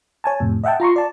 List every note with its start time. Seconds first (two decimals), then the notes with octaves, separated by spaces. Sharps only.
0.24 C#5 G#5 A5
0.40 F2 A2 C3
0.64 D#5 E5 F#5 G5 A5
0.80 F4 A#5 C6 C#6
0.96 D5 A5